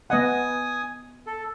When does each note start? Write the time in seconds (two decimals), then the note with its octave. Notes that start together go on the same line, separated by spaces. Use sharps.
0.10 B3 D#5 F#5 G#5 D#6
1.26 A4